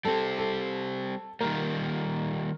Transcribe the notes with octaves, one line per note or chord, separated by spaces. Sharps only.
G3 C4 G4 A4
A4
D#3 G3 A#3 A#4